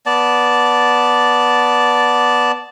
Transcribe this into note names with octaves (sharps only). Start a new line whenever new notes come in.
B3 D5 A5